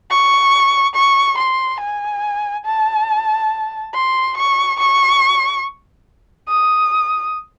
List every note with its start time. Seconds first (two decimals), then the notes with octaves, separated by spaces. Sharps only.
0.10 C#6
0.95 C#6
1.38 C6
1.80 G#5
2.66 A5
3.94 C6
4.37 C#6
4.79 C#6
6.49 D#6